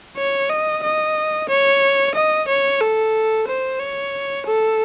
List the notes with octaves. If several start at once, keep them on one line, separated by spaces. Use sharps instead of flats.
C#5
D#5
D#5
C#5
D#5
C#5
A4
C5
C#5
A4